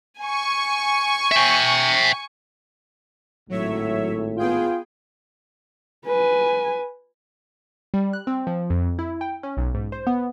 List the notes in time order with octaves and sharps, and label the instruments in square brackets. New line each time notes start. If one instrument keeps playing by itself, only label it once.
[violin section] G#5 C#6
[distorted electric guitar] E5 G5
[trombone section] G#1 A2 [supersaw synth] F#3 C#5 E5
[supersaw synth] B3 G#4 G5 [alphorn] F4
[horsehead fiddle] B4 G#5
[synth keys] G3
F#6
C4
F3
F2
E4
G5
C#4
B1
G#2
C5
B3